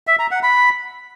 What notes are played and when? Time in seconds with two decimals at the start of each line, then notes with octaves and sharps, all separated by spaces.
0.07 E5
0.19 A#5
0.31 F#5
0.43 B5